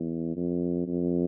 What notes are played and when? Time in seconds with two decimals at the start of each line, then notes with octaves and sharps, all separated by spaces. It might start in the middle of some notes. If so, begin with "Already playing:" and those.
Already playing: E2
0.36 F2
0.87 F2